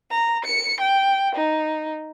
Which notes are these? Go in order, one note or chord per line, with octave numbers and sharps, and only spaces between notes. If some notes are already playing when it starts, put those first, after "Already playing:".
A#5
C#7
G5
D#4